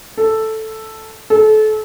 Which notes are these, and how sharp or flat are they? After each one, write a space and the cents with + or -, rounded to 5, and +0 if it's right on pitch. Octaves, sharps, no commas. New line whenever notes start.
A4 +0
A4 -30